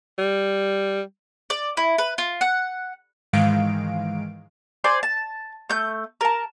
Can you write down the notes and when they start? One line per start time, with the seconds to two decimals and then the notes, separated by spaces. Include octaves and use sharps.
0.18 G3
1.50 D5
1.77 E4
1.98 B4
2.18 F4
2.41 F#5
3.33 G#2 D#3 E3 G#3 F5 D7
4.84 C5 D5 G#5 C6
5.03 A5
5.70 A3 G6
6.21 A#4 A5